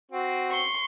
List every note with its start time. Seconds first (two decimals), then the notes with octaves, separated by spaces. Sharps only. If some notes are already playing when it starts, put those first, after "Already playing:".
0.12 C4 F#4
0.50 C6 C#6